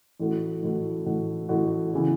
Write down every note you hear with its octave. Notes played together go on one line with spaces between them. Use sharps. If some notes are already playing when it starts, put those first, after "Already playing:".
A1 A2 A3 F#4
A1 A2 A3 F#4
A1 A2 A3 F#4
A1 A2 A3 F#4
C#3 E3 B3